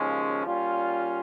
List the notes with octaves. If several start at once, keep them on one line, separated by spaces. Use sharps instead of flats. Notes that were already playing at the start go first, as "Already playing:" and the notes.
Already playing: D#2 C#3 F3 G#3 C#4
A#2 G3 C#4 F4